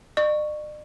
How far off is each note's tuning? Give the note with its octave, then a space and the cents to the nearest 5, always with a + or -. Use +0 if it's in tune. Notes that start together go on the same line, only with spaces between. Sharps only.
D5 +45 C#6 +0